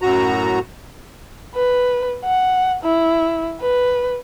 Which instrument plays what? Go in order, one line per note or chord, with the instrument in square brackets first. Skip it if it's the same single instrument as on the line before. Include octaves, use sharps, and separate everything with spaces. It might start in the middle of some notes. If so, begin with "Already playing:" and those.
[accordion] F#2 A2 F#4 A#5
[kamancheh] B4
F#5
E4
B4